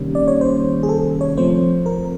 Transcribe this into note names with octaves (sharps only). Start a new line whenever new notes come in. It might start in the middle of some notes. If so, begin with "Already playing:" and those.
Already playing: C3 D#3 G3 A#3 C#4
D5
C#5
C5
G#4
A4
C#5
F3 A3 C4 C5
A#4